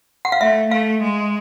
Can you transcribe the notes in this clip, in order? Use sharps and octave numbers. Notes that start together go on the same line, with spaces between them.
F#5
F5
A3 E5
A3 F5
G#3